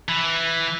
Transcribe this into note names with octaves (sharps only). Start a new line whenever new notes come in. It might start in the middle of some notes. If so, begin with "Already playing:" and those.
E3